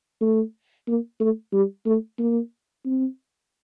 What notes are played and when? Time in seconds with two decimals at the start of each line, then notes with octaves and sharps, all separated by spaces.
0.21 A3
0.88 A#3
1.20 A3
1.53 G3
1.86 A3
2.19 A#3
2.85 C4